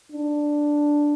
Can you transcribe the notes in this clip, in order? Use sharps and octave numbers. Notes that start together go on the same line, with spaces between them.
D4